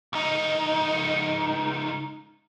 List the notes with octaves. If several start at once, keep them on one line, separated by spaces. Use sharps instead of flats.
C#2 D#4